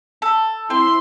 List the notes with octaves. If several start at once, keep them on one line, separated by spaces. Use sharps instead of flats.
A4
C4 E4 C6